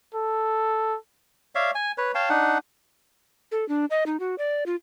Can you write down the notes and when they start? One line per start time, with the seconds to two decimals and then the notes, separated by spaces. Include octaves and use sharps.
0.15 A4
1.55 C#5 D5 E5 F5
1.75 G#5
1.98 B4 C#5
2.15 C#5 F5 G5 A5
2.30 D4 D#4 F#5
3.52 A4
3.69 D4
3.90 D#5
4.06 D#4
4.20 F#4
4.38 D5
4.66 F4